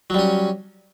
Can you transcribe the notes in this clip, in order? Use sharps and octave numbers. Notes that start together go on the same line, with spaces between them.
F#3 G3 C#4